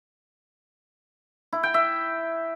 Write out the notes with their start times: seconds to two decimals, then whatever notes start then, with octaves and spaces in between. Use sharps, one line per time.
1.53 E4
1.63 G5
1.74 E5